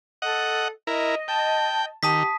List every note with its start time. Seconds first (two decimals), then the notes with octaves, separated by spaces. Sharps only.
0.22 A4 D#5 F#5
0.87 E4 A#4 D#5
1.28 G5 A5
2.03 D#3 G4 A5 D#6 B6